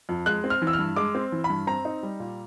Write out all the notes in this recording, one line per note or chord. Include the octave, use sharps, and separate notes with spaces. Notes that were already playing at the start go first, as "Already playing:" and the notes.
F2
G#3 F#6
C4
F6
E3
E6
F6
G2
G#3 D6
C4
E3
B5
G2
C4 A#5
D#4
G3
A#2